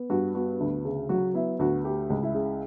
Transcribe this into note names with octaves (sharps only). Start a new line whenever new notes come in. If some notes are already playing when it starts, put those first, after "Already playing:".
Already playing: B3
G2 F#4
B3 F#4
D2
C#3
F#3 F#4
B3 E4
D2 F#4
A3 G4
C#2
E4
C#3